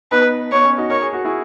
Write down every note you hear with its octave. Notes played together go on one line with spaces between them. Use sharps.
B3 D#4 B4
B3 C#5
C#4
D#4 F#4
A#4 C#5
G#4
F#4
E4 G#4